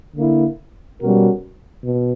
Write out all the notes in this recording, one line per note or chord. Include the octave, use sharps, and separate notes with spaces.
D3 A#3 E4
B2 G3 C#4 F#4 A#4
B2